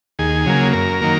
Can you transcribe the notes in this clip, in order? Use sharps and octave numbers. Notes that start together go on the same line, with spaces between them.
D#2 G#4
C#3 F#3 A#3
F#2 A#4
D#3 F#3 A#3